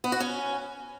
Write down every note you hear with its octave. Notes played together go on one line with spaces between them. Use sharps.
B3
F#4
C#4